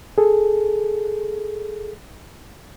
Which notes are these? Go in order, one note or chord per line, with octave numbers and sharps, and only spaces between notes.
G#4 A4